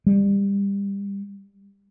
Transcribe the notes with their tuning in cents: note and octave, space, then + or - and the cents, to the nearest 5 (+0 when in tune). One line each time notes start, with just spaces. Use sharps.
G3 +25